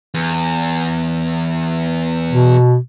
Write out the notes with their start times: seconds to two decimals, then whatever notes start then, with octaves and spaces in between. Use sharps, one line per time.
0.14 E2
2.31 B2